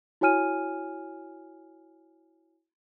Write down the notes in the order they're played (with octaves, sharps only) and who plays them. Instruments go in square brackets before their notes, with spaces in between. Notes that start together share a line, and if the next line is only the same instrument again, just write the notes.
[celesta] E4 F#4 C#5 G#5 F6 D#7